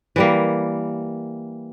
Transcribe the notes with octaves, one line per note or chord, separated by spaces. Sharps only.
E3 G3 A#3